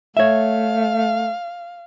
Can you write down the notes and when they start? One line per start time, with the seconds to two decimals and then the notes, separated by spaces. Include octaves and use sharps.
0.17 A3 C#5 E5 F5